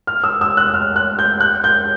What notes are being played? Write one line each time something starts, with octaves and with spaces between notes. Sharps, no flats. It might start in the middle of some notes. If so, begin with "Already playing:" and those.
F6
E6
E6
F#6
F6
F#6
G6
F#6
G6